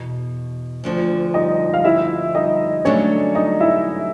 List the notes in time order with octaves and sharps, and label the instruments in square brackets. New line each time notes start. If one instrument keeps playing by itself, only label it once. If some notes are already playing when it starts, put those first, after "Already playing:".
Already playing: [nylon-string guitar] E2 B2
D2 D3 F3
[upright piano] D#4 D#5
F5
E4 E5
D#4 D#5
[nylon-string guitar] D3 F#3 A3 D4 [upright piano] C#4 C#5
[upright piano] D#4 D#5
E4 E5